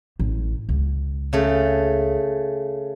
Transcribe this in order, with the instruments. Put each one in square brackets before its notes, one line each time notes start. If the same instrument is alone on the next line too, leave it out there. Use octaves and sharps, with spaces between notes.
[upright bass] A1
C#2
[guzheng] C#3 A3